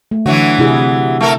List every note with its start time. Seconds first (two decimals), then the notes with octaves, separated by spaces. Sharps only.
0.11 A3
0.26 D3 E3 F#3 F#4
0.59 C3 E4 G#4
1.21 A3 A4 A#4